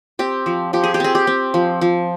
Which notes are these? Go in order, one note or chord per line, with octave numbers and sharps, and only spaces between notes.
C4 G4
F3
F3 G4
G#4
G4
C4 G#4
G4
C4
F3
F3